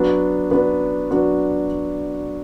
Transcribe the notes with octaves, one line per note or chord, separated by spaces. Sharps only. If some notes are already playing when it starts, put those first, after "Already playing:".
Already playing: F#3 B3 D4 F#4
F#3 B3 D4 F#4
F#3 B3 D4 F#4